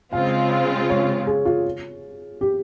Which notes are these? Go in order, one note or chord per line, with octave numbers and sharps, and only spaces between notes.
C#3 G#3 C4 F4 F5
C#5
G#4
F4
G4